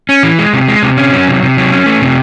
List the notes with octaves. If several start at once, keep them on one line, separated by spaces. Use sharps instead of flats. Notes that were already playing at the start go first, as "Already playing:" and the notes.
C#4
E3
G#3
C3
G#3
C3
C#4
F#3
C3
C3
F#3
C#4
A3
C3